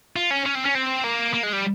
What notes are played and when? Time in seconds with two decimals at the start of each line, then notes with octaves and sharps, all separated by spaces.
0.16 F4
0.31 C#4
0.46 C#4
0.55 C4
0.66 C#4
0.75 C4
1.04 A#3
1.34 A#3
1.43 G#3
1.53 G3